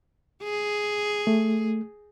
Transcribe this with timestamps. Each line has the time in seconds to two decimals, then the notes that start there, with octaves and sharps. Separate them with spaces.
0.44 G#4
1.27 A3